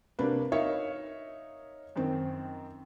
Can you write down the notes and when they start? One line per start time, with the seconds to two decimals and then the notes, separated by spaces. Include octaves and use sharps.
0.19 C3 A#3 D4 F#4 B4
0.52 D#4 A#4 C#5 E5 F5
1.96 F#2 D#3 C4